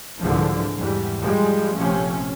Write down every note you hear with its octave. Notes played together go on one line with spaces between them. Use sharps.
C2 G#2 D3 E3 F3
E2 G#2 E3 G3
F3 G3 G#3
A#1 C3 F3 A3 C#4